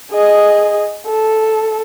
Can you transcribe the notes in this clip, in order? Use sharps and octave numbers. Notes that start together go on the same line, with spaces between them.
G#4 D#5
A4